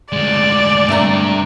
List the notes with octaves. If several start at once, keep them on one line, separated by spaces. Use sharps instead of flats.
D2 G#3 D5
G2 C3 A3 D4 A#5